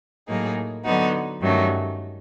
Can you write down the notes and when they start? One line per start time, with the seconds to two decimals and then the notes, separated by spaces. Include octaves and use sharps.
0.28 A2 F#3 A#3 D#4 G#4
0.84 D3 F#3 B3 D#4 F#4
1.41 G2 D#3 F#3 A3 C#4